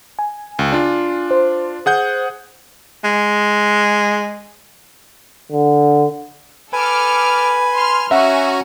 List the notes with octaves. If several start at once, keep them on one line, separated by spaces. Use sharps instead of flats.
G#5
C#2
D4 F4
C5
G#4 F#5 G6
G#3
D3
A4 B4 G#5 D6 F6
C6 F6
C#4 F#4 E5 F#5 G#5 A#5